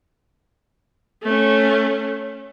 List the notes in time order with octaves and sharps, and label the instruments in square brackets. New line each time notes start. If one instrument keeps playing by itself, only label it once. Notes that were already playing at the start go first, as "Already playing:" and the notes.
[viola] A3 C#4